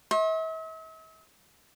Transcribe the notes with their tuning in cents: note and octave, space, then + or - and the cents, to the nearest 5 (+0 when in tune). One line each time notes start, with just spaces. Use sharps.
E5 -45 C6 +45